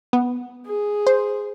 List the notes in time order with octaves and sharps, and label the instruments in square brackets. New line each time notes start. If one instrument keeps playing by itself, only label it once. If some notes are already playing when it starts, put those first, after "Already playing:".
[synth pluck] B3
[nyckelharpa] G#4
[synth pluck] C5